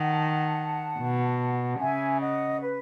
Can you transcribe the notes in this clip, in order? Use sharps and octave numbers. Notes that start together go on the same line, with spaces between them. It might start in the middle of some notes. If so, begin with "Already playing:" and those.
Already playing: D#3 F#5 A5
B2
C#3 E5 G#5
D#5 F#5
B4